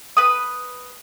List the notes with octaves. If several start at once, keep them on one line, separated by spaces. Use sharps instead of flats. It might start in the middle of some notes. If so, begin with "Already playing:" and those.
B4 D#6